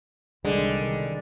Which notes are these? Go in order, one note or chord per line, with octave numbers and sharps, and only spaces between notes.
C2 D3 D#3 G3 G#3